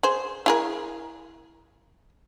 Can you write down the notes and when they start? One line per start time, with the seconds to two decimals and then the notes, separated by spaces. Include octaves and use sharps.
0.03 G#4 C5
0.46 E4 G#4 A#4